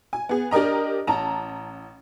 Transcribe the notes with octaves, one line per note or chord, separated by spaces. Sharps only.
G#5
B3 G#4
D4 G4 A#4 D#5 A#5
A1 A5 A#5